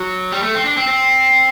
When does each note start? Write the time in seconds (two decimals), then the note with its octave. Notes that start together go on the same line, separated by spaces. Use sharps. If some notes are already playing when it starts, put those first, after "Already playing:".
Already playing: F#3
0.32 G3
0.43 A3
0.55 C4
0.66 D4
0.77 C4
0.88 C4